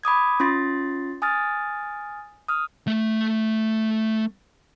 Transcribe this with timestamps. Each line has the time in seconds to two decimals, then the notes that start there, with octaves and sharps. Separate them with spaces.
0.03 B5 D6 D#6 G#6
0.40 C#4 F4 C6 A6
1.22 G#5 D#6 F6 A6
2.48 D#6 F6
2.87 A3 E5